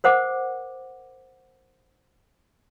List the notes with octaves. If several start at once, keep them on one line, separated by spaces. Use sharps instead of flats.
A#4 C5 F#5 D6